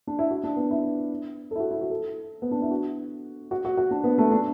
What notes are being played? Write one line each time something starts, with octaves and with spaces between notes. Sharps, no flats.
D4
E4
F#4
D4
B3
E4
A4
E4
F#4
E4
F#4
A4
B3
D4
E4
F#4
F#4
F#4
F#4
D4
B3
A3
D4